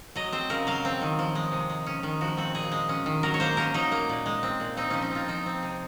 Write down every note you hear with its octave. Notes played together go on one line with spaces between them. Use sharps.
F#3 D#5
C4 C5
C#3 A#4
F#3 F5
C4
D#3
F3
G#3
C3
G#3
C#4
D#3
F3 F#4
C4 F#4
A#2 G#4
G#3
C#4
D#3
F#3 A#4
C#5
A#3 C5
C#4 A#4
F#3 D#4
A#3
A#2
G#3
C4
A#2
C4 D#4
F3 C#4
D#4
C4 F4
F3 D#4
C4
C3